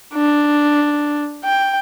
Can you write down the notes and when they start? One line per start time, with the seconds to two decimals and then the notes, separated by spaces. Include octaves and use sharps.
0.14 D4
1.44 G5